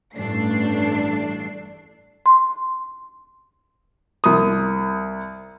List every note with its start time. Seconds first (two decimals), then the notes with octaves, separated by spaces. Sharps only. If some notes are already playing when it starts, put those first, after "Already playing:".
0.16 A1 G2 A3 D4 C7
2.26 C6
4.24 C2 D#6